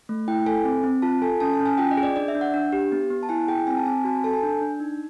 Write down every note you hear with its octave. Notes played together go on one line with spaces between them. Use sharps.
A3
E4 G5
A4 G#5
C4
C4
F4 A5
A4 G#5
C#4 A5
A5
C#4
G#5
F4 G5
D#5
G#4
D5
D4 D5
E5
D4
F#5
D4
G4
B3
B3
A5
E4 G#5
G#4 G5
C4 G#5
A5
C4 G#5
F#4 A5
A4 A5
G#5
D4
D4
D#4